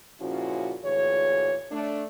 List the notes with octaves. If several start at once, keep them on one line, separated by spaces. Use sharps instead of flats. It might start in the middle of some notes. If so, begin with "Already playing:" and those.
A#2 C#3 F3 C#4 E4 F#4
D2 A#2 E3 G#4 C#5
A3 D4